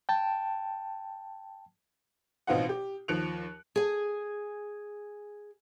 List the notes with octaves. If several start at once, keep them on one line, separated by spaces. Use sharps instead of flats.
G5 A5
A1 B2 C4 D#4 F4 F#5
G4
D#2 F3 F#6 C#7 D7 F7
G#4 G#5